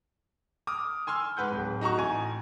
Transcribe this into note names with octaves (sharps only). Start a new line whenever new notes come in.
D6 D#6 F6
G#5 C6 E6 F6
G#2 B4 F#5 G6
D1
D#4 F#4 A#5 C#6
A1 G#5